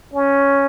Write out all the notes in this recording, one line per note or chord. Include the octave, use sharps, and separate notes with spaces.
C#4